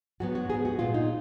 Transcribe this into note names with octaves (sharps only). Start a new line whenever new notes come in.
G#2 F#3 B3 F#4
F#4
G#2 F#3 B3 G#4
F#4
A#2 G#3 B3 F4
D#4